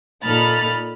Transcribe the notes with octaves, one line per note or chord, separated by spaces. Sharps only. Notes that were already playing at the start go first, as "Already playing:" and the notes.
A#2 D#4 A4 B5 F6 A6